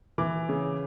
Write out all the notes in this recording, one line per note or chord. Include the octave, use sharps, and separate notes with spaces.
E3 D6
C#3